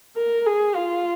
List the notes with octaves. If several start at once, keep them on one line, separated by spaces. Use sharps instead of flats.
A#4
G#4
F4